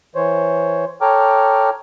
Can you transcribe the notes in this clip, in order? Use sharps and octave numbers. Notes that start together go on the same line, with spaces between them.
E3 C5 C#5
A4 C#5 G5 A#5 D6 F6